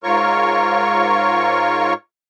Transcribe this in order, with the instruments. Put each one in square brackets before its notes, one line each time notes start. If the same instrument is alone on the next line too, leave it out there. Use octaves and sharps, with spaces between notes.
[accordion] G#2 F4 A#4 C#5 C#6